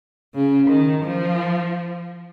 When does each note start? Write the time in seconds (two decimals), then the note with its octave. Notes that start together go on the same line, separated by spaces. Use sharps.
0.35 C#3
0.69 D#3
1.04 F3